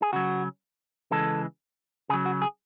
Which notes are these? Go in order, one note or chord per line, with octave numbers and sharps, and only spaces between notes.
G#4
C#3 F#3 F#4
C#3 E3 G#3 A4
C#3 F#3 G#4
F#4
G#4